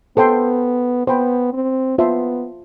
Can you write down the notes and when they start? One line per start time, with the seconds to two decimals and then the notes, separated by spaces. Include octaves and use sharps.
0.17 B3 A4 C5 G5 C6
1.07 B3 C5 G5 B5
1.53 C4
1.98 B3 F4 C5 E5 A5 C6